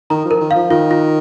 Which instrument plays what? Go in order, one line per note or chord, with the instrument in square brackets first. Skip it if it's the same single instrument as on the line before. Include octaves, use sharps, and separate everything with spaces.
[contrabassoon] D#3 [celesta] A#5
[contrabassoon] F3
[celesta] A#4
[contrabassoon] D#3
[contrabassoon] F3 [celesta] F5
[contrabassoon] D#3 [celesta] F4
[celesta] F4